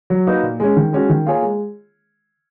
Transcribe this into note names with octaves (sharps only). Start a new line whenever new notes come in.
F#3
A#3 D#4 F#4 B4
A#2
G#3 C#4
D#3
G#3 C#4 F#4
D#3
A#3 F4 G#4 C#5
G#3